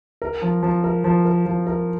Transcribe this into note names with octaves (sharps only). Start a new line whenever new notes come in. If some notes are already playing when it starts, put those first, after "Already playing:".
A#4
F3
F3
A#4
F3
A#4
F3
A#4